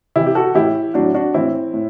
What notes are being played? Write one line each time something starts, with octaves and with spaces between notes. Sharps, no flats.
C3 E3 E4 G4
G4
F#4 A4
A2 E3 E4 G4
A2 F#3 D4 F#4
D4 F#4
A2 E3 C4 E4
A2